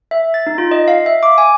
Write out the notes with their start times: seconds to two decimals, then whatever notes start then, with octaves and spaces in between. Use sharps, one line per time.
0.11 E5
0.34 A6
0.47 D#4
0.58 F4
0.71 D#5
0.88 F5
1.06 E5
1.23 D6
1.38 G#5